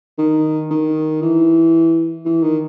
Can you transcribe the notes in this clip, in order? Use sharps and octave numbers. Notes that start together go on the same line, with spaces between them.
D#3
D#3
E3
E3
D#3